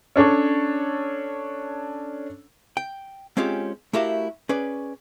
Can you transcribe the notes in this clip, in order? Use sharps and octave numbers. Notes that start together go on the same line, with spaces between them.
C#4 D4 A4 C#5
G5
G#3 C4 C#4 F4 G4
A3 E4 F#4 G4 A#4 F5
C#4 G#4 B4 D5